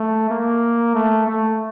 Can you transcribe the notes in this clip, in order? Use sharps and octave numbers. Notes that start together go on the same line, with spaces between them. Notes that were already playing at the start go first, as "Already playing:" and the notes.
Already playing: A3
A#3
A3
A3